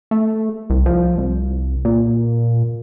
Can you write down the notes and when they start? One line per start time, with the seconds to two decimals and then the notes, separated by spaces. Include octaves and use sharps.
0.11 A3
0.70 C2
0.86 F3
1.18 C2
1.85 A#2